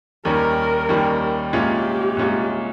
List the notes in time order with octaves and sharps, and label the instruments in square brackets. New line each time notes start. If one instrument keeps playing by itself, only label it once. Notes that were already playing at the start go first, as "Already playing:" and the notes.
[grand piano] D#2 D#3 G3 C#4 [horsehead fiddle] A#4
[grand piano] D#2 D#3 G3 C#4
[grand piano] C2 A#2 G#3 C#4 F4 [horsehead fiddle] G4
[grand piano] C2 A#2 G#3 C#4 F4